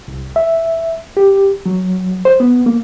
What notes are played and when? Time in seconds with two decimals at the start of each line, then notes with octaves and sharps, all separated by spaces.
0.08 C2
0.36 E5
1.17 G4
1.66 F#3
2.25 C5
2.40 B3
2.66 A#3